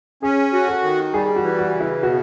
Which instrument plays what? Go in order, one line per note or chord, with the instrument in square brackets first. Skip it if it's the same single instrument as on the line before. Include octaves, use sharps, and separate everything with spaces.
[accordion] C#4 [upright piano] G#4
[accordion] F#4
[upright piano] A4
[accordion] D#3
[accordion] G3 [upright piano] G#4
[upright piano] F#4
[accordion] E3
[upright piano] F#4
[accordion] C#3
[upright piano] E4
[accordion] B2 [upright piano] F#4